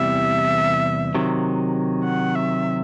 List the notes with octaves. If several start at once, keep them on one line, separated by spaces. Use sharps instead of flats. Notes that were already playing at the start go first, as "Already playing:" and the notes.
Already playing: E2 C3 E3 G3 E5
C3 D#3 F#3
F#5
E5